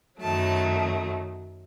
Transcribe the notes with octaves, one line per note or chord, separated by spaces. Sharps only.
F#2 D#3 F#3 A3 A5